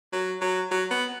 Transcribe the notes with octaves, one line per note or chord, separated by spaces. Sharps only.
F#3
F#3
F#3
B3